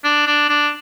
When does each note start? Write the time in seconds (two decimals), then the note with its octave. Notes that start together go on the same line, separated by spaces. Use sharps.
0.04 D4
0.27 D4
0.49 D4